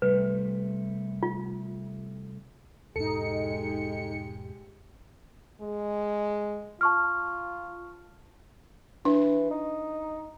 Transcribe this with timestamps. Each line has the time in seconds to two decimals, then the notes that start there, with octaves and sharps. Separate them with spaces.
0.02 C3 G3 A3 B4
1.23 F4
2.96 E1 G#2 G#3 D#4 G4 A4 C#7
5.61 G#3
6.81 F4 A5 C#6 F6
9.05 E3 D4
9.51 D#4